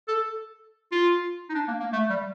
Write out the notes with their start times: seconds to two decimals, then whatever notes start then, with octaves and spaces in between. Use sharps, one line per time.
0.08 A4
0.92 F4
1.50 D#4
1.55 D4
1.68 A#3
1.80 A#3
1.93 A3
2.10 G3